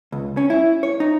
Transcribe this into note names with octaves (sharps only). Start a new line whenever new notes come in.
C#2
C#4
E4
C#5
D#4